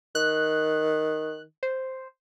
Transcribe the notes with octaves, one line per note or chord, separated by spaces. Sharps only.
D#3 F#6
C5